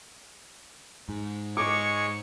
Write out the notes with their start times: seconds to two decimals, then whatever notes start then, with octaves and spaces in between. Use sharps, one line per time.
1.09 G#2
1.57 G#3 C#5 C#6 D6